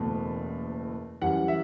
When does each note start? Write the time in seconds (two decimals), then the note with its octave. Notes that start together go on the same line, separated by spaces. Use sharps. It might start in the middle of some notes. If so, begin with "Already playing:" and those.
Already playing: F#1 E2 B2 A3
1.22 F#2 E3 G3 F#5
1.48 E5